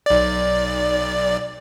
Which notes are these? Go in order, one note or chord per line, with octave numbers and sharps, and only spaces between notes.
B1 D5